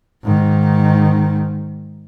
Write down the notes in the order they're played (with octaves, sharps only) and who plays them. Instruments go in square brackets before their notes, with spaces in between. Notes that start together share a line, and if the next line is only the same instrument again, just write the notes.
[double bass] G#2 D#3